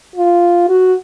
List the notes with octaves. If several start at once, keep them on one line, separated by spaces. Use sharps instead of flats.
F4
F#4